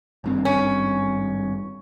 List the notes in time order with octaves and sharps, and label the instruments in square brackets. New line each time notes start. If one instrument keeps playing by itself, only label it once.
[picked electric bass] G#1 G2 C4
[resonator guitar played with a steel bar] C#4